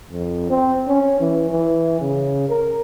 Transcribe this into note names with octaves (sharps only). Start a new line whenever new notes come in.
F2
C4
C#4
E3
E3
C#3
A#4